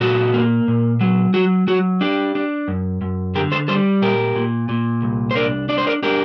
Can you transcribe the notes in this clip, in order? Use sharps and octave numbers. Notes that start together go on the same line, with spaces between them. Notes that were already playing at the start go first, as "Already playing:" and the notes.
A#2 F#4 A4
A#3
A#2
F#3
F#3 F#4
F#3 F#4
D4 G4
D4
F#2
F#2
D3 G4 A#4
A4 C5
G3 A4 C5
A#2 G4 A#4
A#2
A#2
C2
C5
D4 A#4 D5
D4 D5
C5
A#4 D5
D4 G4 A#4